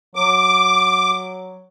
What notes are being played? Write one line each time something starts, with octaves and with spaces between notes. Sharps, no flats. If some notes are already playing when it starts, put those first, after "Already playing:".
F#3 D6